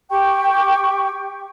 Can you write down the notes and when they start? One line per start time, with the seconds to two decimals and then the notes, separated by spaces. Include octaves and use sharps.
0.11 G4 G5 C#6